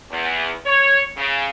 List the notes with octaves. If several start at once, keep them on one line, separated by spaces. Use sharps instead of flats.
E2
C#5
C#3